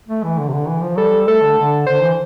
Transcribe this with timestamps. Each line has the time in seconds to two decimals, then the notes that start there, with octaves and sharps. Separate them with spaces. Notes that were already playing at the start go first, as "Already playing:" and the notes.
0.08 A3
0.23 E3
0.38 D3
0.48 C3
0.53 D3
0.68 E3
0.82 F3
0.97 G3 A4
1.28 A3 A4
1.42 D3
1.57 D3
1.86 D3 C5
2.02 E3